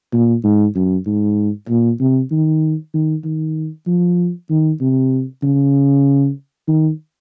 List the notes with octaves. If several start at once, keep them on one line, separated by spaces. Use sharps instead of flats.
A#2
G#2
F#2
G#2
A#2
C3
D#3
D#3
D#3
F3
D#3
C3
C#3
D#3